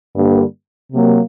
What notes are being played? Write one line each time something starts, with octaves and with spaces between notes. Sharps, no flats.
G2 D3 G3 A#3
C3 F#3 A#3